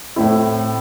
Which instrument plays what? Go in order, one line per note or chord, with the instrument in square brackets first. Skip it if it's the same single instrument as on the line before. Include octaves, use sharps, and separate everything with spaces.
[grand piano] A2 A3 C4 E4